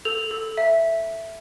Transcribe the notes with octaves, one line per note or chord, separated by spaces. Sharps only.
A4 F7
A4
E5